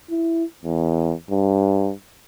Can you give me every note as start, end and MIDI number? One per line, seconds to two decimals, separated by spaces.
0.10 0.44 64
0.64 1.13 40
1.31 1.92 43